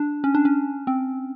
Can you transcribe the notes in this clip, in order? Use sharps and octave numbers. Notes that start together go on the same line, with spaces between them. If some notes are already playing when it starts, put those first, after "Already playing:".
Already playing: D4
C#4
D4
C#4
C4